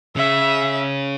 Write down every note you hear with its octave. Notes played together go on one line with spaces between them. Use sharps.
C#3 E5